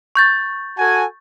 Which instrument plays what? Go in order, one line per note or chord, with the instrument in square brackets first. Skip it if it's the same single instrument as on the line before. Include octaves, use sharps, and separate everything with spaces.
[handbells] C#6 G6 A6
[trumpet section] F#4 A4 G#5